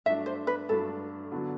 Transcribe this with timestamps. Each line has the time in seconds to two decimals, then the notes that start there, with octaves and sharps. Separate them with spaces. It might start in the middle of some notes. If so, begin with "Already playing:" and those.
0.06 G2 F#3 A3 D4 E5
0.26 C5
0.47 B4
0.69 G2 F#3 A3 D4 A4
1.32 D3 F#3 B3 D4 F#4